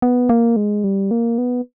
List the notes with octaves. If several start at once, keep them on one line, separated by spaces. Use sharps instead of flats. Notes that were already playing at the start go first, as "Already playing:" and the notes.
B3
A#3
G#3
G3
A#3
B3